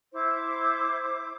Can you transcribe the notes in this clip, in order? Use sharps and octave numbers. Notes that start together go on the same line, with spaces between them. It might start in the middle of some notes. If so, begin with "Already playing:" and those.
E4 C5 D6